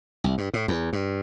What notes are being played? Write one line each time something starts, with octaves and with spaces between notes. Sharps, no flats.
C2
G2
A2
E2
G2